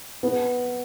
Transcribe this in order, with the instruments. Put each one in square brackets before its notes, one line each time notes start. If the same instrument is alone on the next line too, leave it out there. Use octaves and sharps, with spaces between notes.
[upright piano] B3